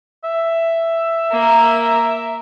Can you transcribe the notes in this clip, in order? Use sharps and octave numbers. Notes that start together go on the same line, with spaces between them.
E5
A#3 A#4